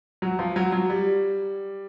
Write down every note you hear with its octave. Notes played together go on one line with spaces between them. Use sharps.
F#3
F3
F#3
F#3
G3